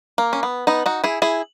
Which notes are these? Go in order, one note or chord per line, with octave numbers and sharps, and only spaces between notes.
A#3
C#4
B3
B3 D#4
D#4 F#4
E4 G#4
E4 G#4